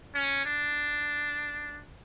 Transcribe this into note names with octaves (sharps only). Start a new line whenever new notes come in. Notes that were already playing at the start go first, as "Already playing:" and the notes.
C#4
D4